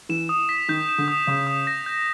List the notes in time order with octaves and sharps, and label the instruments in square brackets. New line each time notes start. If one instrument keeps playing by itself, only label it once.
[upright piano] E3 [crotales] E7
[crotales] D#6
B6
[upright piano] D#3 [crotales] G6
[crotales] E7
[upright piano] D3
[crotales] D#6
[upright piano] C#3 [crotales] D#6
[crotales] D#6
A#6
G6